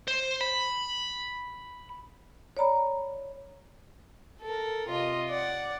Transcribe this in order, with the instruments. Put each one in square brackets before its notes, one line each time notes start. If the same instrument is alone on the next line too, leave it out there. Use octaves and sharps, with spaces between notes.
[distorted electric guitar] C5
B5
[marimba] C#5 D5 A#5 B5
[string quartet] A4 A#4
C3 F4 D#5
D5 F#5